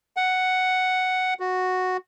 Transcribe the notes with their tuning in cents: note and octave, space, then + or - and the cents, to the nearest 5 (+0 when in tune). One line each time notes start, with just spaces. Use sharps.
F#5 +5
F#4 -5